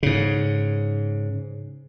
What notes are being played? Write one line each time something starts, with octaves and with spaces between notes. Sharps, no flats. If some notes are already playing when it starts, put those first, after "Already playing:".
G#2 C#3